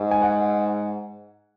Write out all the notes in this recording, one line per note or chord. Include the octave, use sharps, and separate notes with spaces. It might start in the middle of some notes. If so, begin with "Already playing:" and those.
Already playing: G#2
G#5
F#5